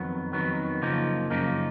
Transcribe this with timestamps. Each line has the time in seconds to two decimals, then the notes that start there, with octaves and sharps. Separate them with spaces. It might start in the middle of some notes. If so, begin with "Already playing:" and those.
Already playing: F2 D#3 F#3 B3
0.33 F2 D#3 F#3 B3
0.81 F#2 C#3 F3 A#3 D#4
1.30 F#2 C#3 F3 A#3 D#4